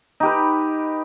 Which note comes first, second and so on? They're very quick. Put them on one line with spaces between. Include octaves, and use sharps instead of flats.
D#4 G4 B4